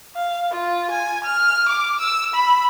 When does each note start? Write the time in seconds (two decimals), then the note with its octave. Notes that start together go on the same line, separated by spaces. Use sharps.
0.16 F5
0.52 F4
0.92 G#5
1.24 F6
1.69 D6
2.00 E6
2.34 B5